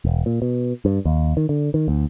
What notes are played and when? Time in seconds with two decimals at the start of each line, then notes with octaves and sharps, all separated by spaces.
0.05 E1
0.26 A#2
0.42 B2
0.85 G2
1.05 D#2
1.37 D#3
1.49 D3
1.74 D#3
1.88 D2